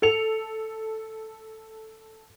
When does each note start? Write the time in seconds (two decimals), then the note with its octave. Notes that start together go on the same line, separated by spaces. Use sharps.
0.02 A4 C#7 F7